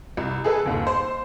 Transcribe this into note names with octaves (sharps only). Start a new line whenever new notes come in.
C2
G#4 A4 B4
G1 D#2
C5 C6